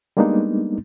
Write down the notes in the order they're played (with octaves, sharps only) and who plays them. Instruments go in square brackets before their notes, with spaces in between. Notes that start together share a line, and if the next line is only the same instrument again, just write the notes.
[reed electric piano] G3 G#3 A#3 B3 D4 D#4